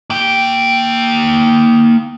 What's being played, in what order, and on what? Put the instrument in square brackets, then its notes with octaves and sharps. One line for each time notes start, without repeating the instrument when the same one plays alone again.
[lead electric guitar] A#3 G5